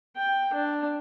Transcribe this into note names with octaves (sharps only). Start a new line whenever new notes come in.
G5
D4